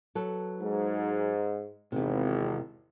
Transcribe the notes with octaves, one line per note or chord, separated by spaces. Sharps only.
F#3 A4 B4
G#2
G#1 E2 C3